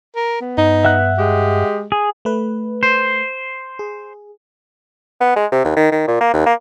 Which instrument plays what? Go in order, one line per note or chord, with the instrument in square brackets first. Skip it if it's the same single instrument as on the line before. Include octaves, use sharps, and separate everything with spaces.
[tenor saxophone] A#4
B3
[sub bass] G2 [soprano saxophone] D#4
[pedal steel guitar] E5 F#5 F#6
[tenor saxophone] G#3 [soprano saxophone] G4
[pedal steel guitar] G#4
[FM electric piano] A3 B4
[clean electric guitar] C5
[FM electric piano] G#4
[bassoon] B3
G#3
C3
D#2
D#3
D#3
A#2
A#3
D#2
A#3